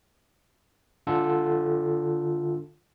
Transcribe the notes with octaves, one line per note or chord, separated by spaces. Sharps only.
D3 F4 A4